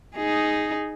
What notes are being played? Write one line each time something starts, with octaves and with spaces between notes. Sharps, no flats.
D#4 G#4